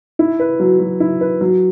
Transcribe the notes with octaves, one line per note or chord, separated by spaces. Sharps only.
E4
B4
F#3
F#3
E4
B4
F#3